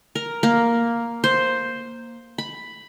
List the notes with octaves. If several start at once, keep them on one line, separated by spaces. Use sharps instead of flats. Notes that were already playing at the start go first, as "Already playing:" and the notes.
A#4
A#3
C5
B5